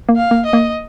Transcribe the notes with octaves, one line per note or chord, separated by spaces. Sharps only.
A#3
F5
A#3
D#5
A#3